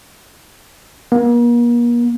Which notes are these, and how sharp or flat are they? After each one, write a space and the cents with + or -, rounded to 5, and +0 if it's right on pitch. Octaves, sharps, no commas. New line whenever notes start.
A#3 +40